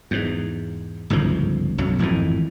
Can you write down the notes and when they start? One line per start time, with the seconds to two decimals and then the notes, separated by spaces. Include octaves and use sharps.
0.11 E2 G#2
1.10 G1 C#2 G#2 F3
1.78 B1 F#2 F#3
1.99 G#1 F2 A2 E3